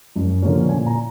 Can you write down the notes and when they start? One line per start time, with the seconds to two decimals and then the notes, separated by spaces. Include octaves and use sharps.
0.16 F#2
0.42 D3 F3 A#3 C#4
0.69 A#2 G#5
0.86 A#5